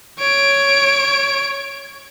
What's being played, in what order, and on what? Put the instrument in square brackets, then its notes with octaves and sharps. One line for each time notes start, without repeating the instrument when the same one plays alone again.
[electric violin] C#5 D7